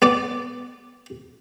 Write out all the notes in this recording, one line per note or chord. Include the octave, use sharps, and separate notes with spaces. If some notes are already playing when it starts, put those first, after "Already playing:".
B3 D5 D6